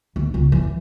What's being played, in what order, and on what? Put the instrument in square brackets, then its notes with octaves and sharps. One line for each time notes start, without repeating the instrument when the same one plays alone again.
[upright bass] D2
C#2
E3